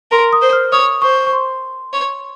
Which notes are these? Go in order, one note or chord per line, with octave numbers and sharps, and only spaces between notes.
A#4 C6
D#6
C5
F6
C#5 D#6
C5 C#6
C#6
C6
C#5